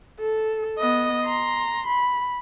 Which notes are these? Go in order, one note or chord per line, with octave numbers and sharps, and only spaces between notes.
A4
B3 D#5
A#5 C6
B5